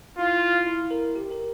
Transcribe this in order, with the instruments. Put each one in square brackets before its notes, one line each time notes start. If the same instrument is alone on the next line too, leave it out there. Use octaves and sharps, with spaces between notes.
[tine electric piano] E4 [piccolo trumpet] F4
[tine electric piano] E4
A#4
G4
A#4